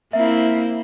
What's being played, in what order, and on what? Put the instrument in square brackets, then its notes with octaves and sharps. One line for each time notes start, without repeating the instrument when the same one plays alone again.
[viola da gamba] A#3 C4 E4 [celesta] E5